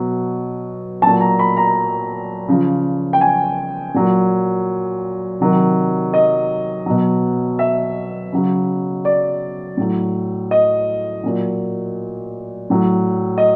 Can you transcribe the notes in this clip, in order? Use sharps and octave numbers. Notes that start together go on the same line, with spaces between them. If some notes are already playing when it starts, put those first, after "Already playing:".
Already playing: B2 F#3
A#2 F#3 A5
A#5
B5
A#5
C#3 F3
G5
G#5
A#2 F#3
C3 D#3 F#3
D#5
B2 F#3
E5
C#3 F#3
D5
A2 F#3
D#5
A#2 F#3
A2 F#3
D#5